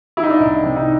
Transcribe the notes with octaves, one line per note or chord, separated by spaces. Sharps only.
D#3 E4
D#4
D4
C2 D#4
C3
D#4